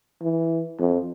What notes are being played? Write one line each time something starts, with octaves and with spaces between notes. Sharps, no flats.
E3
F2